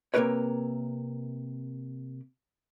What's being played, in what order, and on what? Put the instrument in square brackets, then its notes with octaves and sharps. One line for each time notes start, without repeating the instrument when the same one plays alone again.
[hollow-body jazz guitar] C3 A#3 D#4 A#4 B4 C#5